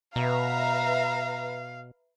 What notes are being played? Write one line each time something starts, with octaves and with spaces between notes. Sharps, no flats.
B2 B4 E5 F5 A#5